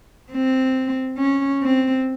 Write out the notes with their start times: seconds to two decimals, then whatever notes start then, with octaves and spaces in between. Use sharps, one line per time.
0.32 C4
1.18 C#4
1.62 C4